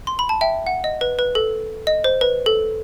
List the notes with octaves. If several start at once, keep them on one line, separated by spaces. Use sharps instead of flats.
C6
B5
A5
E5 G5
F#5
D#5
B4
B4
A4
D#5
C5
B4
A4